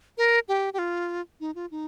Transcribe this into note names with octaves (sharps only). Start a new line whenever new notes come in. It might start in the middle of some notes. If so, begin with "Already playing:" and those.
A#4
G4
G4
F4
D#4
F4
D#4